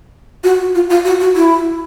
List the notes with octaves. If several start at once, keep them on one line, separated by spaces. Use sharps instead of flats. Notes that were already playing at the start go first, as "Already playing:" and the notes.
F#4
F#4
F4
F4
F#4
F#4
E4